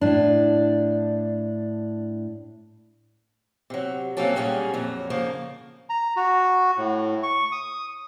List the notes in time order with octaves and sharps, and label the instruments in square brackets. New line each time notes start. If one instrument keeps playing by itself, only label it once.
[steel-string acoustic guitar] A2 D4
C3 F#3
C3 F#3 G3 A#3 C#4 A4
A#2 F#3 G3 A#3 C#4 G#4
F2 A#2 F#3
C#3 F3 A#3
[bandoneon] A#5
F#4
A2
C#6
D#6